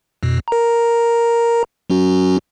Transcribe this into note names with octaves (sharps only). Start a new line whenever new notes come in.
F2 B2
A#4 A#5
F#3 C#4 F#4